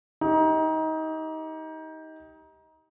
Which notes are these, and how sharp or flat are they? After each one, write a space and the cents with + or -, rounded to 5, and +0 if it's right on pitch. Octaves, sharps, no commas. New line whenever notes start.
D#4 +25 G4 +0